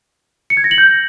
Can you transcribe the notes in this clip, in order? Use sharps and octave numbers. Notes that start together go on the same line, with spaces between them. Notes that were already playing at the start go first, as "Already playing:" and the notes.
C#7
G#6
A#6
F#7
G6